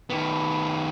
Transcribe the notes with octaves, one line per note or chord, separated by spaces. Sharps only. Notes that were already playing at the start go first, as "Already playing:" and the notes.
D#3 B3